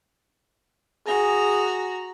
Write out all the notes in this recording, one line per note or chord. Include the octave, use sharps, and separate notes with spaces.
F#4 G#4 A#5